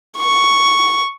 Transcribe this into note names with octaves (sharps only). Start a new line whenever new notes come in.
C#6